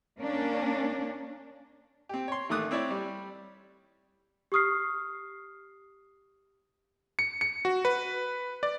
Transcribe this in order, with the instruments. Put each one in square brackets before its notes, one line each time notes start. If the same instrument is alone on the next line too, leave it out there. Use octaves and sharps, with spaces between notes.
[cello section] A#3 C#4 D4
[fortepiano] C4 G4
C#5 C6
A1 D#3 A3 D6 D#6 F#6
C4 E4 C#5 D5
G3
[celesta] G4 C#6 D#6 F6 C7
[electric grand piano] C#7
C#7
F#4
B4
D5